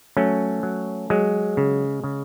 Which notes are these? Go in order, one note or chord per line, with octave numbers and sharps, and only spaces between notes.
F#3 A3 C#4
F#3
F#3 G#3
C#3
C#3